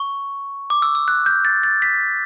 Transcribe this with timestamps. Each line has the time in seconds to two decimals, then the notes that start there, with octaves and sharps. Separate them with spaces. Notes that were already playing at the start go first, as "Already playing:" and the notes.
Already playing: C#6
0.70 D6
0.82 E6
0.95 E6
1.08 F#6
1.26 G6
1.45 A6
1.63 A6
1.82 B6